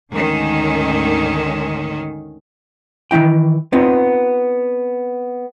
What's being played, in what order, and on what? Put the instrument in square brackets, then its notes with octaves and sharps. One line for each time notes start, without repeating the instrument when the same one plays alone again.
[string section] D2 G#2 D3 D#3 C#4
[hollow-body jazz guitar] D#3 E3 F#3 E4 G5
B3 C4 D#4 F4